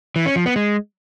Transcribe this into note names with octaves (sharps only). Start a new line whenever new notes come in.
E3
C#4
F3
B3
G#3